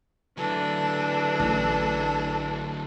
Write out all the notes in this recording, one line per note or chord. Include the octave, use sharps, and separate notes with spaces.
D3 E3 F#3 D4 A4
A1